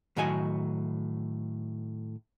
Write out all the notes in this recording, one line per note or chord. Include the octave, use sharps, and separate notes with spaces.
A2 D#3 F#3 F#4 D#5 G#5